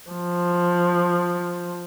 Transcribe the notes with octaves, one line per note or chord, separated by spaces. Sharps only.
F3